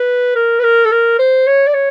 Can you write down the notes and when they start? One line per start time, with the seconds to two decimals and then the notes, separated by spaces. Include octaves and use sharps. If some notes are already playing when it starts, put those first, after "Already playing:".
Already playing: B4
0.35 A#4
0.59 B4
0.63 A#4
0.85 A4
0.91 A#4
1.19 C5
1.47 C#5
1.67 D5
1.74 C#5